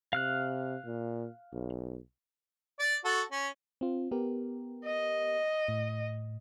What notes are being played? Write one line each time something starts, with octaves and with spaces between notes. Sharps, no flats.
C3 F5 F6 F#6
A#2
B1
D5
F#4 A4
C#4
C4 F4
B3 G4 A#4
D#5
A2